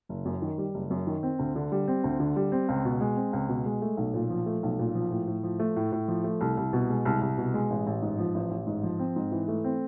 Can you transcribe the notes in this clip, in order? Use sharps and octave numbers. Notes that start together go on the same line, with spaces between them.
F#1
F#2
D#3
G3
F#1
F#2
D#3
C4
D2
D3
G3
C4
D2
D3
G3
C4
C#2
B2
G#3
C4
C#2
B2
G#3
A3
B1
A#2
F3
A3
B1
A#2
F3
A2
A2
F3
A3
A2
A2
F3
A3
C2
C2
B2
G#3
C2
C2
B2
G#3
A1
A1
G#2
F3
A1
A1
G#2
F3
C4
G#2
E3
A3
C4